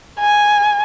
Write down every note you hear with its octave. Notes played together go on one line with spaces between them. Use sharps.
G#5